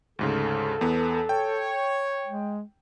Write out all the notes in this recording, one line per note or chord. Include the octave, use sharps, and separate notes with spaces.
D2 G#2 C#3 A4
E2 B3
C#5 G5
G#3